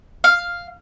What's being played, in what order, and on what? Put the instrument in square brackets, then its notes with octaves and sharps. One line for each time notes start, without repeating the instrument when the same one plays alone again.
[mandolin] F5